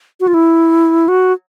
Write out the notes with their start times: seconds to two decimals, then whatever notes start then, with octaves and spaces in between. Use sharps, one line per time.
0.20 F#4
0.27 F4
0.34 E4
1.08 F#4